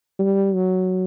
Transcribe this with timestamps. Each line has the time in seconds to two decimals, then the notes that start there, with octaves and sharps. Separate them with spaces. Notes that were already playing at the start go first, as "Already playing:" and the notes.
0.19 G3
0.54 F#3